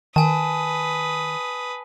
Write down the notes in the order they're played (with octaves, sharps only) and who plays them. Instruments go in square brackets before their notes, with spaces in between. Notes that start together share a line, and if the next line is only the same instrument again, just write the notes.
[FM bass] D#3 [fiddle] B4 D#6 [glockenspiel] G#5 A5